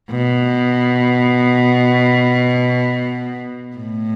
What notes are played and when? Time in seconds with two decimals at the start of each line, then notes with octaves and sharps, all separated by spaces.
0.10 B2
3.76 A2